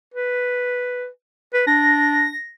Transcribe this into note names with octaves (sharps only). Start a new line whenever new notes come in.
B4
B4
D4 A#6